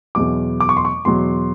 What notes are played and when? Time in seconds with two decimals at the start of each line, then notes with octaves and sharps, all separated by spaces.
0.15 E2 B2 F#3 D6
0.60 D6
0.69 C#6
0.77 C6
0.85 C#6
1.05 E2 B2 F#3 C6